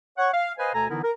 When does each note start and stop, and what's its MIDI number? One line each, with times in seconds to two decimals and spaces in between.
0.18 0.27 73
0.18 0.27 78
0.18 0.27 85
0.32 0.51 77
0.58 0.72 71
0.58 0.72 72
0.58 0.72 75
0.58 0.72 77
0.58 0.72 80
0.73 0.86 38
0.73 0.86 47
0.73 0.86 69
0.73 0.86 80
0.73 0.86 82
0.89 0.99 50
0.89 0.99 52
0.89 0.99 59
0.89 0.99 63
0.89 0.99 64
0.89 0.99 70
1.02 1.11 70